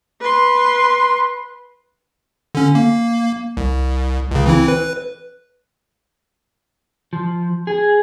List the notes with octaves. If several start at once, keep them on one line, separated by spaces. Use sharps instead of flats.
B4 C6
D3 C#4
A#3
C2
C#2 C#3
E3 C4 E4
B4
F3
G#4